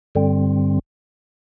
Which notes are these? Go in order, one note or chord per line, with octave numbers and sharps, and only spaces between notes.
G2 D3 G3 C4